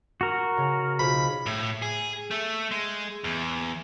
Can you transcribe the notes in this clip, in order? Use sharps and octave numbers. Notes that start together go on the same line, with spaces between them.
F#4 A#4
C#3
B1 F4 C5 B5
A2
G#4
A3
G#3
E2